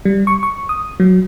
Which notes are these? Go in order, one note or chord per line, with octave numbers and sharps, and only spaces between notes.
G3
C#6
C#6
D#6
F#3